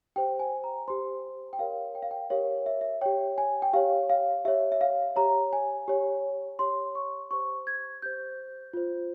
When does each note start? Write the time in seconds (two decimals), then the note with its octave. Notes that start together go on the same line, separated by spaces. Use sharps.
0.16 G4 C5 G5
0.39 G#5
0.64 A#5
0.88 G4 C5 C6
1.53 G5
1.59 G4 A#4 C#5 F5
1.95 G5
2.03 F5
2.11 G5
2.30 G4 A#4 C#5 F5
2.66 E5
2.81 E5
3.01 G4 C#5 G5
3.38 G#5
3.62 G5
3.73 G4 C#5 F5
4.10 F5
4.45 G4 C#5 E5
4.72 E5
4.81 F5
5.16 G4 C#5 A#5
5.53 G#5
5.88 G4 C#5
6.59 G4 C#5 C6
6.95 C#6
7.31 G4 C5 C#6
7.67 G#6
8.02 G4 C5 G6
8.73 F4 C5